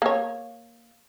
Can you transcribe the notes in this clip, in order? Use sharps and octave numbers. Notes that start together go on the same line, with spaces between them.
A#3 C#5